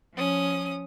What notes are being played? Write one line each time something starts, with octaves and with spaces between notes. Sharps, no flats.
F3 C#4 D#6